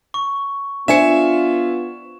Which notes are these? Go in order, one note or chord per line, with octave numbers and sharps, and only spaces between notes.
C#6
B3 D4 F4 C5 E5 G#5 C#7 E7